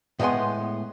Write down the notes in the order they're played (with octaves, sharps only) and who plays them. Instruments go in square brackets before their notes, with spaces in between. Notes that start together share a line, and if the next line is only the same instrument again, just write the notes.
[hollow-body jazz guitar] A2 G#3 B3 G#5 C6